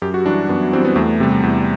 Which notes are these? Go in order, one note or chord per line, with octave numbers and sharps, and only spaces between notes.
F#2 G4
F#4
E3 G3 D4
F#2 B3
E3 G3 C4
B3
E2 A3
C3 G3
E2